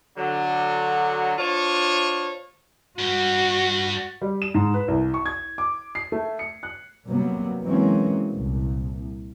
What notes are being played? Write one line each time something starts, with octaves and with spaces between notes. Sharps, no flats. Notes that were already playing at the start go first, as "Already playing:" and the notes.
D3 F#3
D4 F4 C5 C#5
G2 G3 F#4
G3
E7
G#2
B4
C2
C#6
G#6
D6
C7
A3
C#7
F#6
C3 F#3 G3 A#3 B3
E3 F#3 G#3 A#3 C4 C#4
C2 A#2